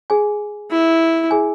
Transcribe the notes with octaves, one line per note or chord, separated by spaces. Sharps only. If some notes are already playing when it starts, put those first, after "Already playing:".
G#4 G#5
E4
G#4 G#5